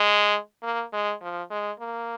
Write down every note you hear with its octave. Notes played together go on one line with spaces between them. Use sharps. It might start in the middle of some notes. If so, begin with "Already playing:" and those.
Already playing: G#3
A#3
G#3
F3
G#3
A#3